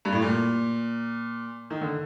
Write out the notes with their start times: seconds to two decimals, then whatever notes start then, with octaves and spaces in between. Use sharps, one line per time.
0.05 G2
0.12 A2
0.22 A#2
1.70 D#3
1.81 D3